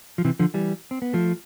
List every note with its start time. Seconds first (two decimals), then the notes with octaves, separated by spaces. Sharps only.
0.18 F3
0.25 C3 E3
0.39 D3 F3
0.54 E3 G3
0.91 C4
1.02 B3
1.13 F3 A3